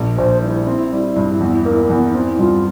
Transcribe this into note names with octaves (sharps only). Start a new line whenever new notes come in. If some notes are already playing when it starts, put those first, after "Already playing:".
Already playing: A#1
A#1 C5
G3 E4
C4
G3
G2
E2
A#3
E2
C4 E4
G2 F4